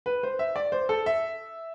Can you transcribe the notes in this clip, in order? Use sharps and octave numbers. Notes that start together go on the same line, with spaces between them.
B4
C5
E5
D5
C5
A4
E5